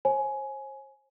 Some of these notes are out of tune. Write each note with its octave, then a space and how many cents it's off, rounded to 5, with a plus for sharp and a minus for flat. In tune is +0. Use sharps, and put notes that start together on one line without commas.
C5 +45 G#5 +15